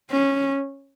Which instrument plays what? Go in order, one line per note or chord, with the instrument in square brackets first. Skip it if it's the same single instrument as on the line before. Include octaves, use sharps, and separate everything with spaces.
[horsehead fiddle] C#4